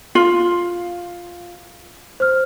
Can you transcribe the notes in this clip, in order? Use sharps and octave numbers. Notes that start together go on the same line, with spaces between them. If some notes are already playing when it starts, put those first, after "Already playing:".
F4
C5 F6